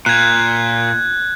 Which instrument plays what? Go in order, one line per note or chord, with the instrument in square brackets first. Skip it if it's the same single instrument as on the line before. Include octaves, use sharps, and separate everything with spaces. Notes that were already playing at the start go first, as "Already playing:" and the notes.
[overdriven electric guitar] A#2 [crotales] F#6 G#6